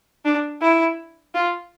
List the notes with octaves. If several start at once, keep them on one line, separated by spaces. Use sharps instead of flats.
D4
E4
F4